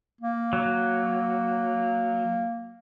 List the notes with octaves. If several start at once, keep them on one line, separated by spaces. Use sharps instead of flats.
A#3
F#3